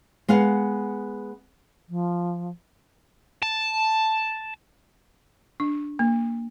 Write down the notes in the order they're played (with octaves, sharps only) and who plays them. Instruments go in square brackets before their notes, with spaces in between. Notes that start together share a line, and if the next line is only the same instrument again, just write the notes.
[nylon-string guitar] G#3 B3 F5 F#5
[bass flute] F3
[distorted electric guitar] A5
[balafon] D4
A#3